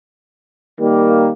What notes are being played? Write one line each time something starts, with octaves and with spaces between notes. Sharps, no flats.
D#3 G3 A#3